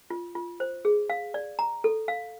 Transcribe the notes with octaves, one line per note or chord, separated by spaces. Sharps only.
F4
F4
C5
G#4
F5
D5
A#5
A4
F5